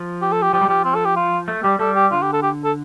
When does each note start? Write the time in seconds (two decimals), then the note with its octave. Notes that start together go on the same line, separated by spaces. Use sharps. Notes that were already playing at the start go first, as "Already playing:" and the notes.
Already playing: F3
0.22 G4
0.32 A4
0.42 G4
0.53 F3 G4
0.61 G3
0.68 F3 G4
0.84 C4
0.95 A4
1.05 G4
1.16 F4
1.48 A3
1.63 G3 G4
1.79 G3 A4
1.96 G4
2.11 D3 F4
2.22 G4
2.33 A4
2.43 G4
2.65 A4